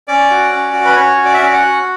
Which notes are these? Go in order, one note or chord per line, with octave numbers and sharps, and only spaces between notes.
C#4 D5
F#4
C#4
F#4
B4
C#4 C#5
F#4
D5
E5
C#4 D5
F#5
F#4